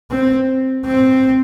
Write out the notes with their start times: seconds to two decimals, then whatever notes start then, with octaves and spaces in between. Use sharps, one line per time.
0.11 C4
0.85 C4